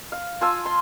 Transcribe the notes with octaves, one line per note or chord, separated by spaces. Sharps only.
F5
F4 G#5 A5 E6
C6